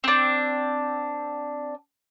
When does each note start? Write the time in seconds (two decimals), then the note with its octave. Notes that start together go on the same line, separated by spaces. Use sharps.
0.04 C4 D4